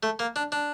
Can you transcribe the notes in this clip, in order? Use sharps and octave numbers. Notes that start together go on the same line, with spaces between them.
A3
A#3
D4
D4